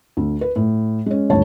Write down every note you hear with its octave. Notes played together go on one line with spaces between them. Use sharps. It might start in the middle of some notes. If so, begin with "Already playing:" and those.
D2
B4
A2
G#3 C#4
D#1 D2 G#2 C#5 A5